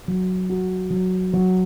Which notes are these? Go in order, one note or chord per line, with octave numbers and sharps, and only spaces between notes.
F#3
F#4
F#3
F#3